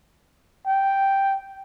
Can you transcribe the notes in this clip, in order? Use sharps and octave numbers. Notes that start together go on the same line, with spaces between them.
G5